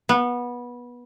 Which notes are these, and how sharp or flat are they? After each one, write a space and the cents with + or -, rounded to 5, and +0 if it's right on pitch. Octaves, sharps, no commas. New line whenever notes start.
B3 -20